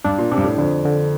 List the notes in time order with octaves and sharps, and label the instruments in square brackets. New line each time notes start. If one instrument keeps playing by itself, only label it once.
[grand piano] G2 [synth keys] D4
[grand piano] A#2
[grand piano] C3 [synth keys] D4
[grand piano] G2
A2
[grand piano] F2 [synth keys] D3
[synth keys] D3